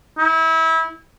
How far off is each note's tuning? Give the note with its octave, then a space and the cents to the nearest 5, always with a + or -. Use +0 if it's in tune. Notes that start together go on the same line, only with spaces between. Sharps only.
E4 -30